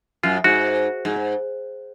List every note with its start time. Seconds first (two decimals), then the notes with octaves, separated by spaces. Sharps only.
0.23 F#2 F4
0.44 G#2 F#4
1.05 G#2